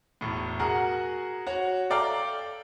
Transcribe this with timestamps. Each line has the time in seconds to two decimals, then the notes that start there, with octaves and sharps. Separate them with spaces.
0.21 E1 A2
0.59 F#4 G#4 A#4 F#5
1.47 F#4 C#5
1.90 A4 D5 F5 G5 A#5